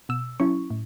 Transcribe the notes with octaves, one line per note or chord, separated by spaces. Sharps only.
B2 E6
F#3 C#4 E4 C#6
A2